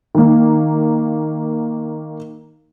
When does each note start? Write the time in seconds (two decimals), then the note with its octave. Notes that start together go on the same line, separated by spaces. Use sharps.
0.15 D#3 A#3